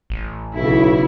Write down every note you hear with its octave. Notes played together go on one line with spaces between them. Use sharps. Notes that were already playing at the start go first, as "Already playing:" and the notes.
A1
B1 C#3 E4